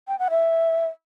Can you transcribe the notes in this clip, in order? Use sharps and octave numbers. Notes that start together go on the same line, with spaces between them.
G5
F#5
E5